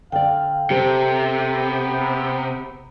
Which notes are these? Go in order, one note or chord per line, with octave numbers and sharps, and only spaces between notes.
D3 D5 F5 G5
C3 G4 A4 A#4 C5
B3